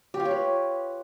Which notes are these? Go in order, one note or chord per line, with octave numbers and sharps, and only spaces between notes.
G4
F4
C#5
B4